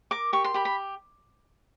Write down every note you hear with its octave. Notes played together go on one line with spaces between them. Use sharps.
A#4 D6
G4 C#6
C6
G4 B5
B5